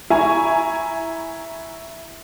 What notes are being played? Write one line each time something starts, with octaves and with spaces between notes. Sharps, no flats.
E4 G#5 A#5 C#6